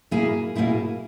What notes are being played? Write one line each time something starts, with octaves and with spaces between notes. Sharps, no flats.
B2 A#3 E4 G#4
B2 A#3 E4 G#4